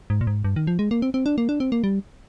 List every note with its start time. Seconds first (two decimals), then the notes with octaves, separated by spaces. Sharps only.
0.10 G#2
0.21 A#2
0.27 G#2
0.44 G2
0.56 D#3
0.67 F3
0.79 G#3
0.91 A#3
1.02 C4
1.14 C4
1.26 D4
1.38 A#3
1.49 D4
1.60 C4
1.72 A#3
1.84 G3